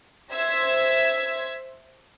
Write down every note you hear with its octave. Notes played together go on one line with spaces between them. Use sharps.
C5 E5 E6 G#6 B6